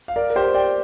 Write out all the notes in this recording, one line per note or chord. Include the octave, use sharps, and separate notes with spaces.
F5
A#4 D5
A#4
G4 C5
D5 G5